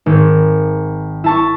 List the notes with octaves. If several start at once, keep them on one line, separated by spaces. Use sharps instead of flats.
G#1
E4 A5 C#6